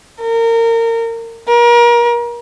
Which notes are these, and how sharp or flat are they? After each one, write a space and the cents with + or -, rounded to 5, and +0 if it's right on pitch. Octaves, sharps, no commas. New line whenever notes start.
A#4 -25
A#4 +35